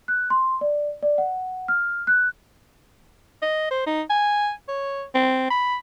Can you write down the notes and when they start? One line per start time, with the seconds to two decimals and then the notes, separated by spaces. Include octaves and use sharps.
0.08 F#6
0.30 C6
0.61 D5
1.03 D5
1.18 F#5
1.68 F6
2.07 F#6
3.42 D#5
3.71 C5
3.86 D#4
4.10 G#5
4.69 C#5
5.15 C4
5.50 B5